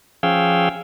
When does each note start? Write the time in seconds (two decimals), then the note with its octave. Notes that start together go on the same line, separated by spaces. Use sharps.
0.23 F3 C#4 G#4 F5 G5 E6